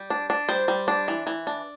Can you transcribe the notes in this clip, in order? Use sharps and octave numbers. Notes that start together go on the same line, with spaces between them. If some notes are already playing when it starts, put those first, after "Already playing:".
Already playing: G3
D4
D4
G3 C5
G3
D4
E3
E3
D4